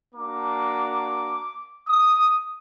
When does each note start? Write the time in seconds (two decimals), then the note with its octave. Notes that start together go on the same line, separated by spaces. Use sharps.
0.14 A#3 D4 F#4 D6
1.88 D#6